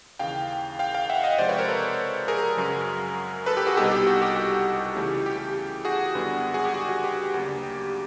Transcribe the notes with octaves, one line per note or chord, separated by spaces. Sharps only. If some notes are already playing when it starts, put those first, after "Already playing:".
D#2 C#3 E3 F5 G5
F5 G5
F5 G5
E5 F#5
D#5 F5
C3 F3 G#3 C5 D5
B4 C#5
A#4 C5
A4 B4
G#4 A#4
F#2 C#3 F#3
A4 B4
G4
F#4 G#4
C2 B2 G3 B3 D#4 G4 A4
G4
F#4
G4
G4
C#3 E3 A3 C#4
G4
F#4 G#4
F#2 D3 G3 B3 D4
F#4 G#4
G4
F#4
F#4
G4
G4
D2 C#3 F#3 A#3 D4
G4